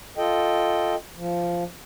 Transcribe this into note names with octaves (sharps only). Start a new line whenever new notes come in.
F4 A4 D#5 G5
F3